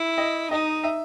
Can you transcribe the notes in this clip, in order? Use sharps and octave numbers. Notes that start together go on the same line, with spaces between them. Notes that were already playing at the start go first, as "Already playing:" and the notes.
Already playing: E4
D#5
D#4 D#5
E5